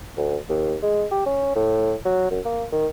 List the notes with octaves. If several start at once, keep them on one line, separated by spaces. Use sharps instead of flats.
D2
D#2
G#3
G4
C#4
A2
F#3
F#2
A#3
D#3